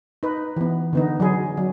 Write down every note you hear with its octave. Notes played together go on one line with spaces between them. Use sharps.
D#4 B4
E3 B3
D3 B3 D#4
F#3 G#4
F#3